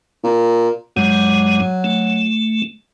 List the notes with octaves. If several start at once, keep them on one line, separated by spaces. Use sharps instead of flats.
A#2
G2 F#3 G#3
A3